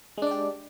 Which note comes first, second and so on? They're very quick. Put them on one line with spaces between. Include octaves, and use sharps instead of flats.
G#3 D4 D5 G4